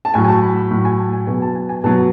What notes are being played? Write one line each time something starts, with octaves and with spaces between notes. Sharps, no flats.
A5
A2 F#3 G#5
G#5
A5
B5
B5
A2 F#3
G#5
A5
G#5
B2 F#3 G#5
A5
G#5
G#5
B2 F#3 A5